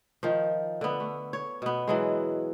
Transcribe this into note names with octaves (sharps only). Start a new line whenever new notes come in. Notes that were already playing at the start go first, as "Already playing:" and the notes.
D#3 F3
D3 B3
A3
C#5
B2 B3
E3 F#3 G#3